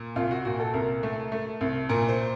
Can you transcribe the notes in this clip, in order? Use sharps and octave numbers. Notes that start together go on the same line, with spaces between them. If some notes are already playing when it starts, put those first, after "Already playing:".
Already playing: A#2
C2 F4
F#4
A#2 F#4
A4
C2 A#4
A3
A3
C2
A#2 A#4
C5